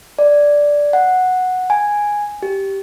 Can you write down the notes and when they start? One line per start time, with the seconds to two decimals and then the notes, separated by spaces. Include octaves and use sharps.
0.19 D5
0.93 F#5
1.70 G#5
2.42 G4